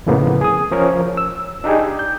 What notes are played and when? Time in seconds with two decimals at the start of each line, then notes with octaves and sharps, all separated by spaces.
0.06 F2 A2 C#3 A#3 B3
0.41 G#4 D#6
0.71 F3 C#4 A#4 C#5
1.17 E6
1.64 D4 D#4 G4 G#4
1.99 G6